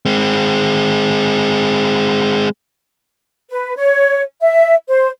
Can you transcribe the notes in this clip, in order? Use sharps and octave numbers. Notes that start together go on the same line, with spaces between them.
G#3 C4
B4
C#5
E5
C5